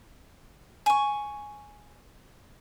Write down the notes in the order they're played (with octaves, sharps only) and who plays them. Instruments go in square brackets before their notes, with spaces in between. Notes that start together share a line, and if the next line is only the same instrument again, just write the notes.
[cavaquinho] G#5 C#6